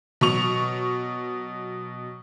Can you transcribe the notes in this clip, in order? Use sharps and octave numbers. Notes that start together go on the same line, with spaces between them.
B2 F#3 C#6 F7